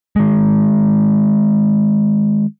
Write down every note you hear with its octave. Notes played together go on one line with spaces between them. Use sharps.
D#3 G#3